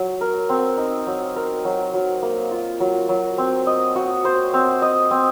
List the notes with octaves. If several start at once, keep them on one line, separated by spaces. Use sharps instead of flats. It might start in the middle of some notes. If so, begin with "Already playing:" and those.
Already playing: F#3
A#4
C4
D#4
F#3
A#4
F#3
F#3
A#3
F4
F#3
F#3
C4
D#5
F#4
C5
C4
D#5
C4